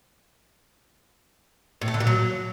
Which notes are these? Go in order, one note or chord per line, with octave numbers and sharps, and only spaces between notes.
A2
A3
D3
A#2
F#3